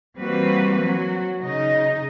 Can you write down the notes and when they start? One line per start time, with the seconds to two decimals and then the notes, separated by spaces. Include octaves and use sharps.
0.18 E3 G3 A#3 C4 F#4 B4
0.82 F#3 F#4
1.41 C#3 D#4 D#5